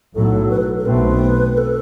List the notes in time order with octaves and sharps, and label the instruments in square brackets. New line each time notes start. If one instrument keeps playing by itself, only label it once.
[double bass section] B1 A2 F#3 [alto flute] A4
[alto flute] B4
A4
A4
[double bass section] B1 B2 A3 C4 [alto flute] B4
[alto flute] A4